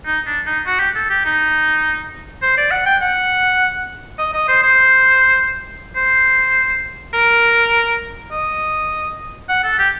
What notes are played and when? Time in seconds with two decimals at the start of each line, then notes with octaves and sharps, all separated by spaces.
0.06 D#4
0.27 D4
0.46 D#4
0.66 F#4
0.80 G4
0.95 A4
1.10 G4
1.25 D#4
2.42 C5
2.58 D5
2.71 F#5
2.86 G5
3.02 F#5
4.19 D#5
4.34 D#5
4.48 C5
4.63 C5
5.96 C5
7.14 A#4
8.32 D#5
9.49 F#5
9.64 A4
9.79 G4